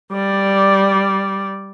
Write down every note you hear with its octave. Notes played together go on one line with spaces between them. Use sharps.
G3 D5